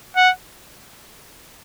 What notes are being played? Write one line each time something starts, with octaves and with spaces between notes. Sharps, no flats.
F#5